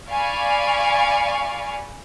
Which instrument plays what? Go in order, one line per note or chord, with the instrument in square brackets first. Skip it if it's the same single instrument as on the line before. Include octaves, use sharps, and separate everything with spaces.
[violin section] D5 F5 G#5 B5 C#6